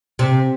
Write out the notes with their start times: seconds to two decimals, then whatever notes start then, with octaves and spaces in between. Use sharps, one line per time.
0.19 C3